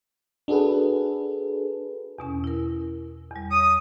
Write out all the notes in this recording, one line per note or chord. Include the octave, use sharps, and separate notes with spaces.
D4 F#4 G#4 A4 B4
E2 B2 C#4
E4 A#4
E2 G3
C#5 D#6